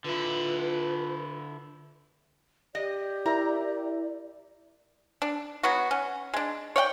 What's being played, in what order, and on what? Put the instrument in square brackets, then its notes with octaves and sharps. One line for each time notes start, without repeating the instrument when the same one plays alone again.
[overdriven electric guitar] D3 E4 [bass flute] F4 [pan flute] B4
[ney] G4 [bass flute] D5 [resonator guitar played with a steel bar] D#5
[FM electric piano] E4 A#4 E5 [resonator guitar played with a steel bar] A#5
[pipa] D4
F#3 B3 F#4
C#4
G#3 D4
C#5 D5 F#5 G5